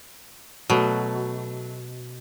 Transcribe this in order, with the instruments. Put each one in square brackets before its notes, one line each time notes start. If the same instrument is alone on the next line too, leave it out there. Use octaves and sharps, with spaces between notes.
[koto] B2 [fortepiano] F#3 A3